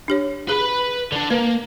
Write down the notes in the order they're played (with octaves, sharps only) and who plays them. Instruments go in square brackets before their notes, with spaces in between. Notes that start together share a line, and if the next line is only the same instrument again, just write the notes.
[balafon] D4 G4 C#5
[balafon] G#4 [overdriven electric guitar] B4 B5
[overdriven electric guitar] D3 D4
[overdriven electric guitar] A#3 [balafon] B4